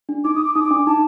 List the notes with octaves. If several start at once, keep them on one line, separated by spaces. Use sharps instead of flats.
D4
D#4 D6
D#6
D6
D#4 D#6
D6
D4
D#4 A5